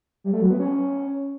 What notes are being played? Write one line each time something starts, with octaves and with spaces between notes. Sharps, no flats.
G3
A3
F#3
B3
C#4